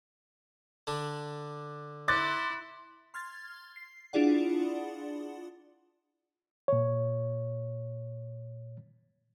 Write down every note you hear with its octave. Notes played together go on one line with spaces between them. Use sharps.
D3 D4
E4 C6 D6 F#6 A6
C6 F6 G#6 A6
C7
D4 E4 F4 G#4 D5 F#5
A#2 C#5